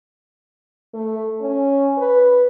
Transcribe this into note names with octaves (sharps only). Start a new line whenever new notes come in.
A3
C#4
B4